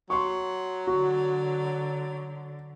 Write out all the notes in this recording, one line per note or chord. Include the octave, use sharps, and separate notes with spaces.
F#3 C6 C#6
D3 F#4